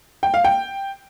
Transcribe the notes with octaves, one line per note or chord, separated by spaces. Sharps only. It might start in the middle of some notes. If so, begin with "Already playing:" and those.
G5
F5
G5